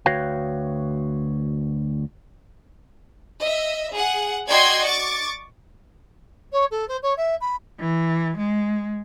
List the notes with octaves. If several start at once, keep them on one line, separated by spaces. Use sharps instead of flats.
D2 F#4 B4 C#5 F5 G5
D#5 E5
G#4 F#5
F#4 D5 D#5 G5 C6 G#6
C#6 D6 A6
C#5
A4
C5
C#5
E5
B5
E3
G#3